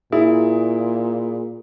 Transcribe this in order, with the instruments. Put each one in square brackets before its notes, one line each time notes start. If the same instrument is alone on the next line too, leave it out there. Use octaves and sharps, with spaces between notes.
[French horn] A#2 [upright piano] E4 [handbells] G#4